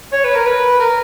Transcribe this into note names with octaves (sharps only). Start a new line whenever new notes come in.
C#5
B4
A#4
B4
A#4